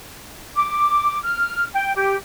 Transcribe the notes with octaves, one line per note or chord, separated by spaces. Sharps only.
D6
F6
G5
G4